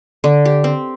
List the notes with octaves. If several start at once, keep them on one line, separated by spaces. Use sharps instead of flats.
D3
G4
C4